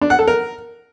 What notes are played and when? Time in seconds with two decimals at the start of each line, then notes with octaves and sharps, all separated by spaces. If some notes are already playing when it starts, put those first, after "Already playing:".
0.01 D4
0.10 F#5
0.19 A4
0.27 A#4